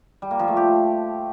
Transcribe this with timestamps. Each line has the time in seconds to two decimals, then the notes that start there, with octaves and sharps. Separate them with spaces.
0.22 G3
0.31 A#3
0.39 F3
0.48 A3
0.57 G4